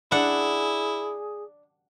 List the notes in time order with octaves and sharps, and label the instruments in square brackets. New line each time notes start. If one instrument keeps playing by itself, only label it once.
[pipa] D4 [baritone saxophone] E4 [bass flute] G#4 [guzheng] F#5